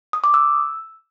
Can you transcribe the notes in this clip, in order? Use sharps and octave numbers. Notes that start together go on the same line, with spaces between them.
D#6
D6
E6